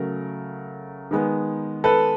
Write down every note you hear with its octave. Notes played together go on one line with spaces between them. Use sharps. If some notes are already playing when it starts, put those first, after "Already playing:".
Already playing: C#3 F#3 A3 A#4
D#3 G#3 B3
A4 B4